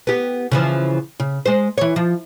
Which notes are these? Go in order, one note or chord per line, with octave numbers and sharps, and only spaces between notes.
B3 G4
C#3 E3 F3
C#3
G#3 C5
E3 C#5
F3